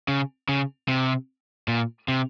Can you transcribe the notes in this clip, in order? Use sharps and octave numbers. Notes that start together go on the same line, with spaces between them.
C#3
C#3
C3
A#2
C3